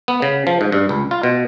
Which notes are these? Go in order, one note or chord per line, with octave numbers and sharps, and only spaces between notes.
B3
C#3
F3
G#2
G2
C#2
F4
B2